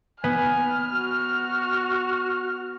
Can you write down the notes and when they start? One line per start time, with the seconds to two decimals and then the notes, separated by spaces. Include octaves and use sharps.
0.24 B3 G#5 F6
0.90 F#4